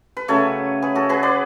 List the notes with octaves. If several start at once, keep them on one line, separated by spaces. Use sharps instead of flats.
B4
C#3 F#3 A3 A4 C#5
G#4 B4
F#4 A4
G#4 B4
B4 D5